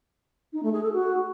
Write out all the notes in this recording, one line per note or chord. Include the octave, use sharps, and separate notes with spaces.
D#4
A3
G#4
A4
F#4